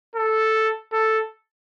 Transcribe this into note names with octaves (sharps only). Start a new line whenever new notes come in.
A4
A4